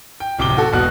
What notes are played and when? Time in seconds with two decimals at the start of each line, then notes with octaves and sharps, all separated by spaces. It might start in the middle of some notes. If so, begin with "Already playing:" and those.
0.20 G5
0.38 D1 C3 D6 G7
0.57 F#4 A4
0.73 E1 B2 F#6